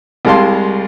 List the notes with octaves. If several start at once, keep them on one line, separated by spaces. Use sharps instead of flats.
C2 G3 G#3 F5 A5 C6